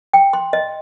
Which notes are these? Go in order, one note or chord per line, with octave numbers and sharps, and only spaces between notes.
G5
C6
D#5